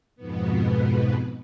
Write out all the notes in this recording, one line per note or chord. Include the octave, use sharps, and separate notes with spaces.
F2 G#2 B2 B3